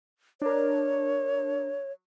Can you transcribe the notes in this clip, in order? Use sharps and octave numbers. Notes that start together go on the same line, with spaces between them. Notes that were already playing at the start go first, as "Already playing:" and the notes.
D4 A#4 C#5